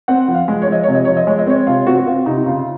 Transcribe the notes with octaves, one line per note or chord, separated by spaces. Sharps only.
C4 F#5
F3
F5
G#3
C#5
F3
D#5
C3 C#5
D#5
F3 C#5
D#5
G#3 C#5
D#5
C4 C#5
C3 F4
C4 F#4
F#4
C4 F4
C3 D#4
D#4
C#3 F4